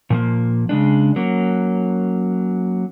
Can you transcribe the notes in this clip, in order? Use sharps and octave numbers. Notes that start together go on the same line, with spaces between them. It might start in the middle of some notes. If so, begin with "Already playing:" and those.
A#2 F3 A#3
C#3 G#3 D4
F#3 A#3 C#4